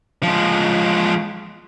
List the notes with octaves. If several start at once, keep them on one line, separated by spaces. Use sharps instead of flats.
F3 G#3